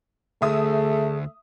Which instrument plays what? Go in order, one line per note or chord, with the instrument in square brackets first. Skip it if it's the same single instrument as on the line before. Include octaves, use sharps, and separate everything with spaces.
[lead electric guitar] D2 [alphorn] A3 [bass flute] G#4 [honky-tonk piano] E5 D#6